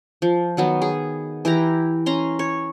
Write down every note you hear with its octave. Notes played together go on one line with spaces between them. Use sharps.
F3
D#3 F#3 B3
G#4
E3 E4 G4 A#5
C#4 A#5 C6
C#5